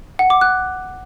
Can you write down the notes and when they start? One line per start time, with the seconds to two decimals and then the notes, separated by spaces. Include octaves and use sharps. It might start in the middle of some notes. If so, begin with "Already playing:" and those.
0.19 F#5
0.30 D6
0.41 F#6